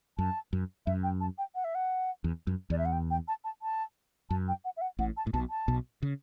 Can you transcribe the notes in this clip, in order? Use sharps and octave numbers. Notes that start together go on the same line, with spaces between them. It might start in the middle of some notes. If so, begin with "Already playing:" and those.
F#2 A5
F#2
F#2 E5
G5
A5
G5
F#5
E5
F#5
E2
F#2
E2 D5
E5
F#5
G5
G5
A5
A5
A5
F#2 A5
G5
F#5
E5
F#5
A1 A2 F#5
A5
A2
B1 B2 A5
A5
B1 B2
C#3